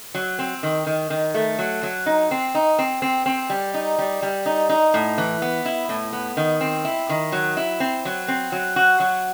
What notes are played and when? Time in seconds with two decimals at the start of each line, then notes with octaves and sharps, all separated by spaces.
0.14 F#3
0.39 C4
0.63 D#3
0.86 D#3
1.10 D#3
1.34 A3
1.59 F#3
1.83 F#3
2.06 D#4
2.31 C4
2.55 D#4
2.79 C4
3.02 C4
3.26 C4
3.50 G3
3.74 D#4
3.98 G3
4.22 G3
4.46 D#4
4.69 D#4
4.94 A2
5.18 E3
5.42 B3
5.65 E4
5.89 A2
6.13 B3
6.37 D#3
6.61 C4
6.85 E4
7.09 D#3
7.32 F#3
7.57 E4
7.80 C4
8.05 F#3
8.28 C4
8.52 F#3
8.76 F#4
9.00 F#3